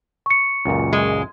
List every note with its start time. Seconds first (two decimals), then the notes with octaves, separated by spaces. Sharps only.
0.26 C#6 C#7
0.65 C#2 F#2 A#2
0.93 G#3